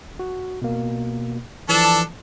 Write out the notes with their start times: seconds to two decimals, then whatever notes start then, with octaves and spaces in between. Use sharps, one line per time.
0.19 F#4
0.62 B2 A#3
1.69 E3 F3 D4 A4